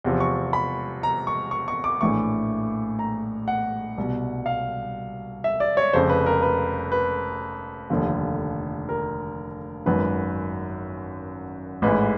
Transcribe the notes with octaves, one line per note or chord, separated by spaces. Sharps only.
E2 C3 F3
C#6
B5
A#5
C#6
C#6
C#6
D6
A#1 A2 E3 C#6
A#5
F#5
C2 B2
F5
E5
D5
C#5
F1 F2 C#3 C5
B4
A#4
B4
B4
F1 D#2 D3 F3
A#4
G#1 F#2 D#3 B4
A1 G#2 E3 B4